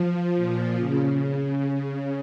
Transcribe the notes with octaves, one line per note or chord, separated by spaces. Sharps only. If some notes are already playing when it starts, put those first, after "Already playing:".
Already playing: F3
A#2
C#3